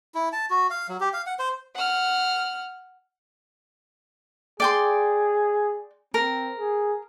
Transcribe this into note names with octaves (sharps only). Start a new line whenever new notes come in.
E4
A5
F#4
F5
F#3
G4
F5
F#5
C5
F#5 F6
G#4 D5 G5 C6
C4 A#4
G#4